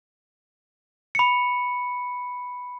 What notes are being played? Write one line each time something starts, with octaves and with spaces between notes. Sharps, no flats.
B5 C#7